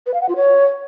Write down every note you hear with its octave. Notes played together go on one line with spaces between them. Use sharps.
B4
F5
F#5
F4
C#5